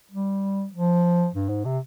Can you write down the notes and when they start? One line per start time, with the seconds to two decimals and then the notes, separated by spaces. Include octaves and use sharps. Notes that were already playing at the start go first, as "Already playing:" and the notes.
0.12 G3
0.73 F3
1.34 G2
1.49 G#2
1.65 C3